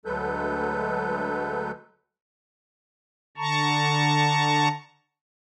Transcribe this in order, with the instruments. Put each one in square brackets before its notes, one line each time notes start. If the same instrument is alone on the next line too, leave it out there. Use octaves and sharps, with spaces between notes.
[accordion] D2 F#3 G#3 A4 B4 G6
[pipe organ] D3 A5 A#5 C#6